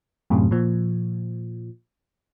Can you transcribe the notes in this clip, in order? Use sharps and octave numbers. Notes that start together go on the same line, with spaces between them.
F#2 A2 C3
A#2 F3